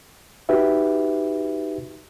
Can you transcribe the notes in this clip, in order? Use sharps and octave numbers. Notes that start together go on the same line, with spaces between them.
D#4 F#4 G4 B4 E5